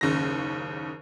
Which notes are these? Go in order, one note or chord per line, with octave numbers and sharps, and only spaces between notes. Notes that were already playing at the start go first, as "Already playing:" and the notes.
F#1 D#2 C#3 A#6